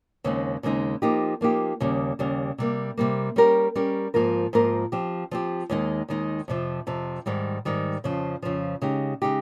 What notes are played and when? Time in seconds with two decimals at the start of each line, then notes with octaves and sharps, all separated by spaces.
0.24 D#2 C#3 G#3 C4 D#4
0.63 D#2 C#3 G#3 C4 D#4
1.02 F3 A#3 D#4 G4
1.41 F3 A#3 D#4 G4
1.80 D#2 C#3 G3
2.19 D#2 C#3 G3
2.58 C3 G3 A#3
2.98 C3 G3 A#3
3.36 G3 C#4 G4 A#4
3.75 G3 C#4 G4 A#4
4.14 G#2 F3 A#3 F4 A#4
4.53 G#2 F3 A#3 F4 A#4
4.92 F3 C4 G4
5.31 F3 C4 G4
5.70 D#2 D#3 G#3 D#4
6.09 D#2 D#3 G#3 D#4
6.48 F2 C3 F3
6.87 F2 C3 F3
7.26 G#2 D#3 G3
7.65 G#2 D#3 G3
8.04 F2 C#3 F3
8.42 F2 C#3 F3
8.82 C#3 G#3 D#4 G4
9.22 C#3 G#3 D#4 G4